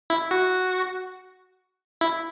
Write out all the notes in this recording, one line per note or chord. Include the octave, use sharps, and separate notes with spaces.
E4
F#4
E4